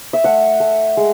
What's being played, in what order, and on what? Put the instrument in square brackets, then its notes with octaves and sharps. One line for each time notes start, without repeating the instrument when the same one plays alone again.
[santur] E5
A3 F#5
A3
G#3